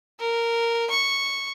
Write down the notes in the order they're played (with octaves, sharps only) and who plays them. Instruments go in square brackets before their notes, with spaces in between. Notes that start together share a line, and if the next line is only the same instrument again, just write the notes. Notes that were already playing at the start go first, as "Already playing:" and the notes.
[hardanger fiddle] A#4
C#6